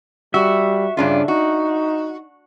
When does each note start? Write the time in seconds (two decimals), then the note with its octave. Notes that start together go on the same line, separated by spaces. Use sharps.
0.34 G3 F#4 E5
0.97 G2 C#3 D4 F4
1.28 D#4 F#4